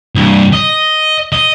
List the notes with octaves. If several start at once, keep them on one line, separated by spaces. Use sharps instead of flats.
C2 G2
D#5
D#5